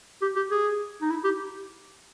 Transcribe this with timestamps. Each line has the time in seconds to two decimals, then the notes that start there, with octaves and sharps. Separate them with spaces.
0.22 G4
0.36 G4
0.51 G#4
1.01 D#4
1.10 E4
1.24 G4